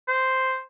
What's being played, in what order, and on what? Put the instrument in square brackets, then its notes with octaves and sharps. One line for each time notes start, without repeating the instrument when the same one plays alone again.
[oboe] C5